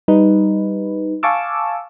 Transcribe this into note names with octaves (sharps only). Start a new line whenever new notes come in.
G3 D#4 B4
F5 G#5 A5 C#6 D6 E6